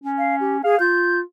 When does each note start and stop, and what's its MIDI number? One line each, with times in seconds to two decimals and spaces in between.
0.04 0.62 61
0.18 0.36 77
0.41 0.57 67
0.64 0.78 68
0.64 0.79 77
0.80 1.21 65
0.80 1.20 91